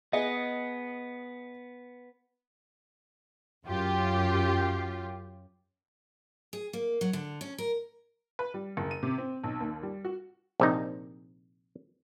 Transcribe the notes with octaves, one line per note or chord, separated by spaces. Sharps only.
B3 G#4 D#5
F#2 F4 G4
G#4
A#3
F#3
D3
C#4
A#4
B4
G3
F#1
D#7
C3
C4
B1
D#2
G3
F#4
A#1 C3 D#4